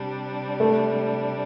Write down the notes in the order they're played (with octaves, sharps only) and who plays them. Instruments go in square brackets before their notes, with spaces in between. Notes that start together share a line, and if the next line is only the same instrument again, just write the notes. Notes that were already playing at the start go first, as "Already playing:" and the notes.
Already playing: [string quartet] C3 G3 D4
[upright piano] A3